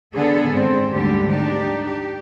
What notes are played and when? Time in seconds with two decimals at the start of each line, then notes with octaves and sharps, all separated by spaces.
0.13 D3 B3 G#4 A4
0.51 G#2 C4
0.93 D2 G#2 D3 G3 G4
1.30 D4 D#4 G4
1.86 G4